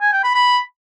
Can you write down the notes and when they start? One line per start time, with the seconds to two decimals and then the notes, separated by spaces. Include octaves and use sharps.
0.01 G#5
0.13 G5
0.24 B5
0.35 B5